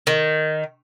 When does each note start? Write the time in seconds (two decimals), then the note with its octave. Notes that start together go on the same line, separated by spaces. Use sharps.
0.07 D#3